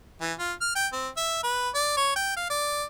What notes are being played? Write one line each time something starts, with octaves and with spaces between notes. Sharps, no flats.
E3
F4
F6
G5
C4
E5
B4
D5
C#5
G5
F5
D5